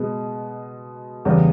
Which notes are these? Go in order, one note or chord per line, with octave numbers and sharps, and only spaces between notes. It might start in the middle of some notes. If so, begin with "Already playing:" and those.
Already playing: B2 G#3 B3
E2 C#3 G3 B3